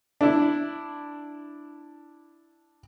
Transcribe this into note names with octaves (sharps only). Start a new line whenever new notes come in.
D4 E4